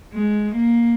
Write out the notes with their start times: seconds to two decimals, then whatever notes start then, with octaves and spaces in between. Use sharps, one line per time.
0.12 G#3
0.55 A#3